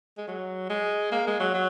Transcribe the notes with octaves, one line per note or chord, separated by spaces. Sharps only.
G#3
F#3
G#3
A#3
G#3
F#3
F#3